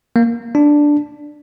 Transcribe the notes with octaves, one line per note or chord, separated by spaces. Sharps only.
A#3
D4